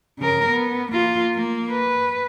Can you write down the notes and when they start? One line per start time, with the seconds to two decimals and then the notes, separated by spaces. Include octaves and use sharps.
0.19 C#3 A#4
0.49 B3
0.92 A#3 F4
1.34 A#3
1.70 B4